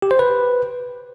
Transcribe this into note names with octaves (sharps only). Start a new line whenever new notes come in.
G4
C5
B4